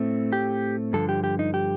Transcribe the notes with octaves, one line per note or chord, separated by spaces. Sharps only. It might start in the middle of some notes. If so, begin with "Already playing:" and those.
Already playing: A2 A3 C4
G4
G2 D3 F3 A4
G4
G4
D#4
G4